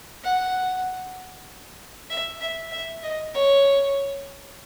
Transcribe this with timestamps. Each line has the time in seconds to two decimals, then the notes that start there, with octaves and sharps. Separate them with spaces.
0.24 F#5
2.10 E5
2.41 E5
2.71 E5
3.03 D#5
3.34 C#5